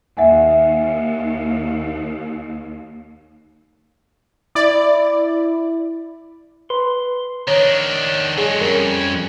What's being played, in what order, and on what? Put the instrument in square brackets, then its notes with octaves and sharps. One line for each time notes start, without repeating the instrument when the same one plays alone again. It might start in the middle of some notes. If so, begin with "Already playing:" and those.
[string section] D#2 [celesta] E5 F#5 G#5
[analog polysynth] E4 [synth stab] D5
[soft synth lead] B4 [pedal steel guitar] C6
[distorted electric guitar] D#3 D4 [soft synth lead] C#5 [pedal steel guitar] A#5
[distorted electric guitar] F#3 G#3 [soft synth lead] G#4 [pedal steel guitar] C#5
[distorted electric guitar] F2 [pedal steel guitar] G3 C#4 C#5 [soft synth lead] A#4
[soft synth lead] G#6